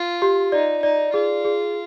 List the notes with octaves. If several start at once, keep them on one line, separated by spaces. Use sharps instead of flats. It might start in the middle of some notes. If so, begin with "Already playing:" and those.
Already playing: F4
G4
D#4 D5
D#4 D5
F4 G#4
G#4